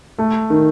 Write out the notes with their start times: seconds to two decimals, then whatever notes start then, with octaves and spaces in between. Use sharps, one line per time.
0.18 A3
0.50 D#3